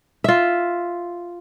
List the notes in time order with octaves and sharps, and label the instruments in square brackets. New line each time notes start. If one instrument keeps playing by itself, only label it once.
[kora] F4 E5